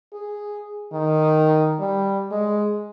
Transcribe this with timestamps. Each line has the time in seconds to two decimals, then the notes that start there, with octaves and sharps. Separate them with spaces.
0.13 G#4
0.93 D#3
1.80 G3
2.31 G#3